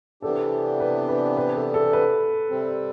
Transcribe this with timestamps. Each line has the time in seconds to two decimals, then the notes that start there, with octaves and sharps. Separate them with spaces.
0.22 C3 E3 B3 D4 G4 A4
0.80 B4
1.09 B4
1.37 B4
1.55 A4
1.74 A4
1.93 B4
2.50 C3 G3 C4